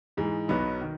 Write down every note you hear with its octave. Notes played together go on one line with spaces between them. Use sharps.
G#2 E3 G#3
B1 B2 F#3 B3 D#4
D#3